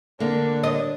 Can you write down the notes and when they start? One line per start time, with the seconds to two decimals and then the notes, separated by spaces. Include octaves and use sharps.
0.20 D3 A#3 D4
0.64 D#5